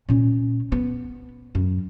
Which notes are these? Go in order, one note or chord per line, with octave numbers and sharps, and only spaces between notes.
A#2 C#4
B3
F#2